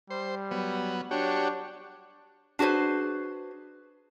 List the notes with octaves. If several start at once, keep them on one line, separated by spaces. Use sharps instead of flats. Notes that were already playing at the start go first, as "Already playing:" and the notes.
G3 C5
F#3 B3
D4 F#4 G4 C#5
D4 F#4 G#4 B4 C5